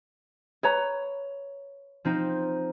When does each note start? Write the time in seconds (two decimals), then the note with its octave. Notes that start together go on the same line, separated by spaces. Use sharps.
0.63 B4 C#5 A#5
2.05 F3 C4 D#4